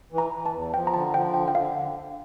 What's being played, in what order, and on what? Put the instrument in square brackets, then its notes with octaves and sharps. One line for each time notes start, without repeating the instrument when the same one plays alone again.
[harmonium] E3
[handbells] A#5
[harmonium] E3
[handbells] A5
[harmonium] E2
[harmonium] F3 [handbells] G5
[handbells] A#5
[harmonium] D3 [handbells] A5
[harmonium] F3 [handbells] G5
[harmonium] D3 [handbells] G5
[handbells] G5
[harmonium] D3 [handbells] F5